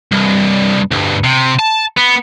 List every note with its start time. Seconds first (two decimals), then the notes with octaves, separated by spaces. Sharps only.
0.12 C2 G2
0.91 D2 G2
1.24 C3
1.59 A5
1.97 B3